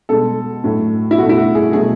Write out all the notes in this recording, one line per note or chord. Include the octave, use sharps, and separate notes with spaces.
B2 G#3 A4
A2 F#3 A3
E4
B2 A3 F#4
E4
F#4
G#4
B2 F#3 A3 G#4